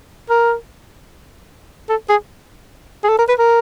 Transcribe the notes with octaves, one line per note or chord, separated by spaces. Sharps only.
A#4
A4
G#4
G#4
A4
A#4
B4
A#4